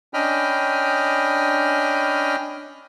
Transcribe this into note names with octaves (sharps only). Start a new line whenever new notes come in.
C#4 D4 D#5 G5 B5 F6